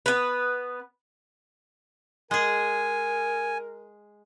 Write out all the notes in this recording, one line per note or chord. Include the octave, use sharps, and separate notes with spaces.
B3 B4
G#3 G#4 A#4 G#5